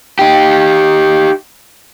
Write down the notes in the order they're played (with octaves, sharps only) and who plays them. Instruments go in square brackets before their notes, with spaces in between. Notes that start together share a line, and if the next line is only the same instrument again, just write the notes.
[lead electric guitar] D#4 G4